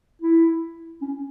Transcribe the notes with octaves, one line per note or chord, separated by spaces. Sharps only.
E4
C#4